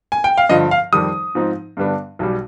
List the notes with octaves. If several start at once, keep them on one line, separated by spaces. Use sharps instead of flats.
G#5
G5
F5
G2 D3 F3 D#5
F5
F2 D#3 G3 D#6
G#2 F3 C4 D#4
G2 D3 G3 B3 D4
B1 B2 G3